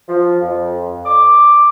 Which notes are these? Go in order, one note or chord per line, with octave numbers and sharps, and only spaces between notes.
F3
F2
D6